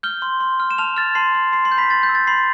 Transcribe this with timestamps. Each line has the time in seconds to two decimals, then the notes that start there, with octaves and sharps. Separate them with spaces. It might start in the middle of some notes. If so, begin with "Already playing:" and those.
0.03 F6 G6 G7
0.22 C6
0.40 C6
0.60 F6
0.71 E7
0.78 A5 F6 F7
0.96 F6 A6
1.15 A5 C6 C7
1.35 C6
1.53 C6 C7
1.65 C6 C7
1.72 G6
1.78 B5 B6
1.90 C6 A6
2.03 G6
2.09 E6
2.15 A6
2.27 B5 C6 C7